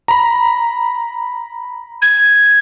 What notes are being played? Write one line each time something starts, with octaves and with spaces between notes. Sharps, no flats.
A#5 B5
G#6